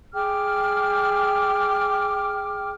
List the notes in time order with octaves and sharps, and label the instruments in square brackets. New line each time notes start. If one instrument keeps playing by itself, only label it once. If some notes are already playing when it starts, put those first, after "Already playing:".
[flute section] G#4 G5 D6 F6